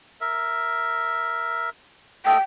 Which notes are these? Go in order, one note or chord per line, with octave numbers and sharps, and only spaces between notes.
A#4 E5
A3 A4 D#5 G5